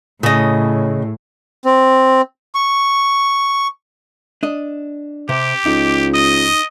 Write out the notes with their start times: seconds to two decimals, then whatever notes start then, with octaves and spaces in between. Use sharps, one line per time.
0.23 A2 C#3 D#5
1.65 C4
2.55 C#6
4.43 D4 D#5
5.29 C3 G4 D6
5.66 C#2 D#4
6.14 D#5 D#6